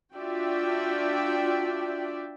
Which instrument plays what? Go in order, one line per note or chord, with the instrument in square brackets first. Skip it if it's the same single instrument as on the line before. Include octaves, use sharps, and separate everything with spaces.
[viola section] D4 F4 F#4 D5 E5 G5